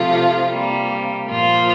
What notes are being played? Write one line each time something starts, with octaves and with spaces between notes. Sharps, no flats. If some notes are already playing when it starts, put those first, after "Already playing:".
Already playing: C3 F3 A3 F4
C3 G3 A#3
A#2 F3 A#3 F4